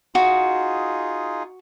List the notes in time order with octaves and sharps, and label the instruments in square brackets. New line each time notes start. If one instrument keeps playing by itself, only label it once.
[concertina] D#4 F4 G#4 [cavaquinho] F#4